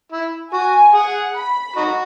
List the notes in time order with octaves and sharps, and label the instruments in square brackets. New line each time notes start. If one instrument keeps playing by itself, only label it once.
[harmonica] E4
[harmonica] F#4 [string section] G#5
[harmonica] G#4 [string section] F#5
[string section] B5
[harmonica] D#4 F#4